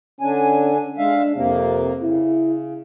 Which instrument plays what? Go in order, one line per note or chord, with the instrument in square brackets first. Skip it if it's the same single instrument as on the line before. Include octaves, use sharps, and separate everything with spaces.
[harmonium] D3 D4 G#5 [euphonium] C#4
[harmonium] G#3 E5 F5 [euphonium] D4
[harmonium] F2 A#3 [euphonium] C3
[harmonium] C#3 [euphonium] E4